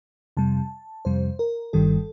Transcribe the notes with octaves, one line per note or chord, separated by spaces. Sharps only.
F2 C3 G3 A5
F2 C3 G3 C5
A#4
G1 G2 D#3 G3 A4